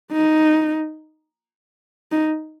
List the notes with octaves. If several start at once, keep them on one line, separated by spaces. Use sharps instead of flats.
D#4
D#4